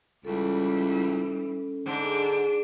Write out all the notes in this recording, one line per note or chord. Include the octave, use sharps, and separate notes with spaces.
C#2 E3 G3 C#4 A4
G#2 D3 D4